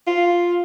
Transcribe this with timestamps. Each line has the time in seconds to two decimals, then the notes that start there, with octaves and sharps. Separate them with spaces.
0.07 F4